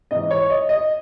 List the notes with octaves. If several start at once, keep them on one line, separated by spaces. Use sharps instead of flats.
G#2 E3 D#5
C#5
D#5
D#5